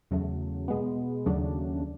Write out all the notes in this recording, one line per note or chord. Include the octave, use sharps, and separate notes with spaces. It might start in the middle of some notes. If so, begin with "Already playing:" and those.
E2 C#3 F#3 A3
B2 G#3 B3
D#2 C#3 F#3 A3 D4